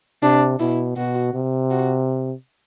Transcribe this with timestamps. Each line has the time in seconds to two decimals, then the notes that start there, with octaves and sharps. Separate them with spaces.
0.23 C3 D4
0.60 B2 E4
0.96 B2 F#4
1.34 C3
1.71 F#4